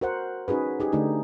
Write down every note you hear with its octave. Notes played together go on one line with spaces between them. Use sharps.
F#4 A#4 C5 F#5
C#4 D#4 F#4 G#4 B4
D#4 G4 G#4
D3 A3 D4 D#4 G4